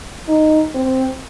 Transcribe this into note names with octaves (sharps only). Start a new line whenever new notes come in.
D#4
C4